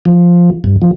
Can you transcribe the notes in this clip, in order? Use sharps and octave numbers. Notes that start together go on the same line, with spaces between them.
F3
G2
F3